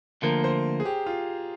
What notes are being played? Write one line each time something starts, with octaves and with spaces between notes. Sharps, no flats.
D2 D3 F3 A#3 A#4
C5
G#4
G4
F4